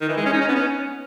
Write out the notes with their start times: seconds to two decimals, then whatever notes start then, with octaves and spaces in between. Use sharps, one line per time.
0.01 D#3
0.09 E3
0.17 G#3
0.26 C#4
0.34 D#4
0.41 C#4
0.48 B3
0.56 C#4